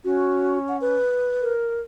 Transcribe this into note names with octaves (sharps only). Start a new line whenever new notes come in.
C#4 F#4
F#5
B4
A#4